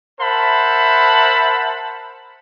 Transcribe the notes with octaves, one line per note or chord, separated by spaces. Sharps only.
A#4 C5 E5 F#5 A5 B5